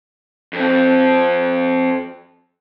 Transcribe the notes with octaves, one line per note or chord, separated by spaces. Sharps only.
F2 C4